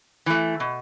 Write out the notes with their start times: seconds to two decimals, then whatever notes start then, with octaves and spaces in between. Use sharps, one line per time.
0.26 E3 A3
0.60 B2